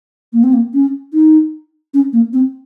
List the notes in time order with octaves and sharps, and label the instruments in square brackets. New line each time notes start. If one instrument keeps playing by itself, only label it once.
[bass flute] A#3
C4
A#3
C#4
D#4
C#4
A#3
C4